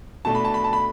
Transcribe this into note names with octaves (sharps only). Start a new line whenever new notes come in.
B2 A3 D4 A5
B5
A5
B5
A5
B5